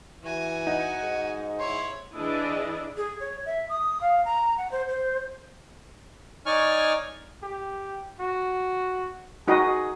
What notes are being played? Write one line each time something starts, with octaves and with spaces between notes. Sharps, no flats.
E3 F#4 G#5
D#4 F#5
G#2
E4 C#5 C6
E3 D4 E4 G#4 D5 D#5
G#4
C#5
E5
D#6
F5
A#5
F#5
C5
C5
D#4 C#5 D5 G#5 C#6 F6
G4
F#4
D#4 F#4 G#4 D#5